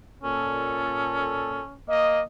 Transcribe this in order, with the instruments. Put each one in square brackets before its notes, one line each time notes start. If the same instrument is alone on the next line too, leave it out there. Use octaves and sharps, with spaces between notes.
[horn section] A#2 A4 [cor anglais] C#4
[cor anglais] A#3 [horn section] D#5